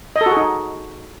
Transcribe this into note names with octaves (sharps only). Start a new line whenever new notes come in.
D#5
A4
F#4
G#4
D#4